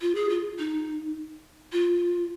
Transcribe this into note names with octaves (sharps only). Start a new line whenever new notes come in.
F4
G#4
F4
D#4
F4